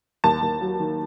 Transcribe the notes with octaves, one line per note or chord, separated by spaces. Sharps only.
D#2 A5
D#2
F#3
D#3